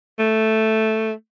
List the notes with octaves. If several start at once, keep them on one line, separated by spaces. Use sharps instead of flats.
A3